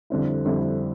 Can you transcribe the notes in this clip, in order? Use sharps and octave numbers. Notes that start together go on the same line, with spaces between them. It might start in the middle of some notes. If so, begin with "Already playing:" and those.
F2 D3 G3 C4 E4
F2 D3 G3 C4 E4